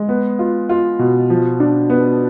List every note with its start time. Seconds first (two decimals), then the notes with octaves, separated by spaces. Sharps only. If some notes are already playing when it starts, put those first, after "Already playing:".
Already playing: G#3
0.09 B3
0.39 F4
0.69 F4
0.99 B2
1.30 F3
1.60 D4
1.90 B3